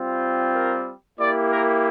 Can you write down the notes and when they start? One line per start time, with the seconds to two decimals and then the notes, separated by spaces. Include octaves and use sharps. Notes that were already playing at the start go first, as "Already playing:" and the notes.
Already playing: G3 C4 F4
0.54 A#4
1.19 A#3 E4 G4 D5
1.51 A#4